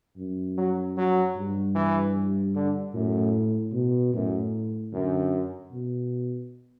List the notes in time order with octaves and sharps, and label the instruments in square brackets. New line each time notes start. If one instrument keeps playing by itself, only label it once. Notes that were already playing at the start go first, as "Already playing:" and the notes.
[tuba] F#2
[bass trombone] F#3
F#3
[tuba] G2
[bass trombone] E3
D3
[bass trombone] F#2 [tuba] A2
[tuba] B2
[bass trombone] F#2 [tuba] A2
[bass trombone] F#2 [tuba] D3
[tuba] B2